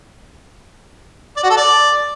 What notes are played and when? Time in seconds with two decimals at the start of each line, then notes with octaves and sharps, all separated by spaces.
1.37 D5
1.43 F#4
1.50 A4
1.57 D5